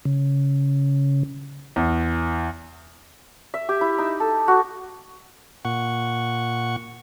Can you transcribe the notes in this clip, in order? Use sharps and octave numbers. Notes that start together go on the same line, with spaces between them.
C#3
E2
E5
G4
E4
D#4
A4
F#4
A#2 F#5 C#6